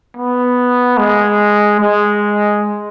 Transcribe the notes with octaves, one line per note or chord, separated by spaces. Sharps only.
B3
G#3
G#3